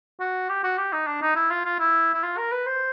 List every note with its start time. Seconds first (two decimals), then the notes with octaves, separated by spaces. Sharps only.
0.20 F#4
0.49 G4
0.64 F#4
0.78 G4
0.93 D#4
1.07 D4
1.22 D#4
1.36 E4
1.51 F4
1.65 F4
1.79 E4
2.14 E4
2.23 F4
2.38 A#4
2.52 B4
2.67 C5